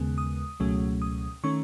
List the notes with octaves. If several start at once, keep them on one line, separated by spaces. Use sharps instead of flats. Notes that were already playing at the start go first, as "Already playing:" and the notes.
Already playing: D#2 C#3 G#3 B3
D#6
C#2 B2 F#3 A3 C#4
D#6
D#3 A3 C#4 C#6